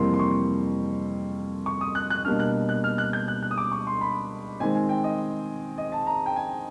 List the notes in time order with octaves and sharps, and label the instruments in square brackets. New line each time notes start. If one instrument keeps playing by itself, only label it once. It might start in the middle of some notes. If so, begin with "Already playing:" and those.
Already playing: [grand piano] F2 C3 E3 G3 A#3 C6
C6
C#6
C#6
D#6
F#6
F#6
B2 G3 A#3 D4 F6
F#6
F#6
F6
F#6
G6
F#6
F#6
D#6
D6
C#6
C6
B5
D#3 G#3 C4 G#5
G#5
G5
D#5
D#5
A5
A#5
G5
G#5